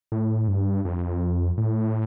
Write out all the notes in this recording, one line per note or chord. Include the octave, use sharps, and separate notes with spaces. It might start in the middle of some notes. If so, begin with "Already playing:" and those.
A2
G2
F2
A2